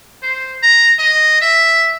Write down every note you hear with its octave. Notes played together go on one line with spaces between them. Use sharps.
C5
A#5
D#5
E5